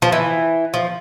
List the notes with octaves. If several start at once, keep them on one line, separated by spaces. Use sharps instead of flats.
F3
E3
F3